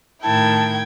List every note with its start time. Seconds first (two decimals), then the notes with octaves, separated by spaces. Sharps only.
0.23 A2 D#3 E4 G5 A5 G#6